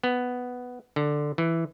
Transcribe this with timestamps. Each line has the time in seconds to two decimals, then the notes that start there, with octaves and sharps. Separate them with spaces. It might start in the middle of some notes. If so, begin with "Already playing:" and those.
0.04 B3
0.96 D3
1.38 E3